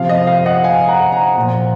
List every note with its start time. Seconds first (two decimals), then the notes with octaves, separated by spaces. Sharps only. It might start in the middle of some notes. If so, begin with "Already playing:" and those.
Already playing: C3 F3 F5
0.09 D#5
0.27 F5
0.38 F5
0.46 D#5 F#5
0.64 F5 G#5
0.88 F#5 A#5
1.12 F#5 A#5
1.37 A#2 F3